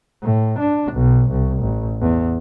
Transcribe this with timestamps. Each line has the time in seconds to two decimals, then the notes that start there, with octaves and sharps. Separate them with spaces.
0.23 A2
0.60 D4
0.93 B1
1.31 C2
1.60 A1
2.01 E2